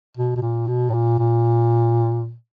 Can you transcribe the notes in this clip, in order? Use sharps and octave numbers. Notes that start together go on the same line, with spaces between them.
B2
B2
A#2
B2
A2
A#2
A#2